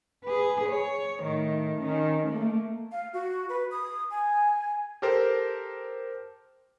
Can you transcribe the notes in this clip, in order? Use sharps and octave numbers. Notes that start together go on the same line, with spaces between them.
G#4 B4
C#5
A2 D#3
D#3 C#4
A3 A#3
F5
F#4
B4
D#6
G#5
G4 A4 A#4 C5